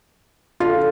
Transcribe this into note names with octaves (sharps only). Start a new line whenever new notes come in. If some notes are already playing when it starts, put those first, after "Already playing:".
D3 F4